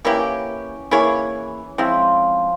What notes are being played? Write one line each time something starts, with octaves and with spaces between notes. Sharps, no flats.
E3 A#3 C#4 E4 G4
E3 A#3 E4 G#4 C#5
F3 G#3 C4 E4